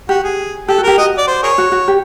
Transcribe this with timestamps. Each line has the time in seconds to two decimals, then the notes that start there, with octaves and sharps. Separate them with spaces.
0.09 F#4 G4
0.24 G#4
0.68 G4 A4
0.78 F#4
0.83 G4 A#4
0.98 F#4 D#5
1.18 D5
1.27 C5
1.43 G#4 A#4 C#5
1.58 F#4
1.72 F#4
1.88 G4